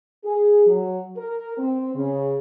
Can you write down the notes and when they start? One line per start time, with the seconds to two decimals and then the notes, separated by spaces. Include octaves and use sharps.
0.24 G#4
0.67 F#3
1.16 A#4
1.58 C4
1.95 C#3